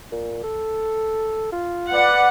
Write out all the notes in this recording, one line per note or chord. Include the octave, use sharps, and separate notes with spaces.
A#2
A4
F4
B4 D5 F#5